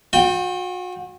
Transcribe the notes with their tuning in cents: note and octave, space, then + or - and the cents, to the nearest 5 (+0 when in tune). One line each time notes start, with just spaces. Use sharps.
F#4 -40 G5 +0